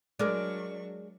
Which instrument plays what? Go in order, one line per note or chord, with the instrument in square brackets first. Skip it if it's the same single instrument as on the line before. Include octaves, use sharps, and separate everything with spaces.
[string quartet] F#3 D4 C#6 [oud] G#3 [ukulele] A#4 D5